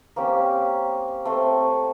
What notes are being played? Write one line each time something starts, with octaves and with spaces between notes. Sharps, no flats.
A#3 C4 C#4 G4
A3 C4 C5